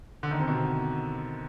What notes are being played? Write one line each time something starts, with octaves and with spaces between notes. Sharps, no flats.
D3
D#3
C3
B2